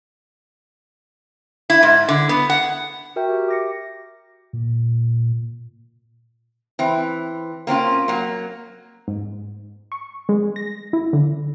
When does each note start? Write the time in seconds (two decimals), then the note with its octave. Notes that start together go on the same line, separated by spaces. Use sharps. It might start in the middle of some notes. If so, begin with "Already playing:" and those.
1.70 E4
1.83 G#2
2.09 D3
2.29 B3
2.50 F#5
3.16 F#4 A#4 E5 G5
3.28 G4 E5
3.48 D6 A#6 C#7
4.53 A#2
6.79 E3 C4
7.67 A#3 C4 C#4 F4
8.08 F#3 A#3
9.08 G#2
9.92 C#6
10.29 G#3
10.56 A#6
10.93 E4
11.13 D3